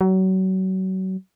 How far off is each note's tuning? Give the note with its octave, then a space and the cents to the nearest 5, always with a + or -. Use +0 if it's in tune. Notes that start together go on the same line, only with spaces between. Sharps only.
F#3 +30